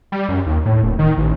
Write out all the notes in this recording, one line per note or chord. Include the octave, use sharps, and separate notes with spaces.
G3
F#2
D#2
A2
D#1
D#3
A1